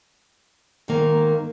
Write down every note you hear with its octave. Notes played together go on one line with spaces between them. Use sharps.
G#2 D#3 A#3